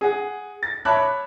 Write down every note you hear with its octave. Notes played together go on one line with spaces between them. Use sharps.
G#4 F#5
A6
C#5 E5 A5 B5 D6 F#6